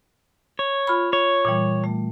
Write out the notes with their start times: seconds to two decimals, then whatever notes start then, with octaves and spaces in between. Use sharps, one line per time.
0.59 C#5
0.87 F4 B5
1.13 C#5
1.45 A#2 E3 G3
1.84 A3